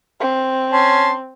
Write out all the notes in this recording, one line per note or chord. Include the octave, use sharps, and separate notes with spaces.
C4
C#4 A5 C6